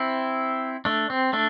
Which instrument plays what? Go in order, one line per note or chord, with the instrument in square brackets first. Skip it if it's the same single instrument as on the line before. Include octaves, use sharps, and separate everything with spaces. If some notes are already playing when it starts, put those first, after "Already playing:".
Already playing: [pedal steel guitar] C4 E4
A3 D4
C4
A3 D4